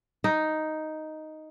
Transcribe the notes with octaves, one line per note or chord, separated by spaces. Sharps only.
D#4